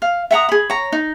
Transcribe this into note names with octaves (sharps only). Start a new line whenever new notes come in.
F5
E5 F#5 A#5 D#6
G#4 B5
C#5 A#5
D#4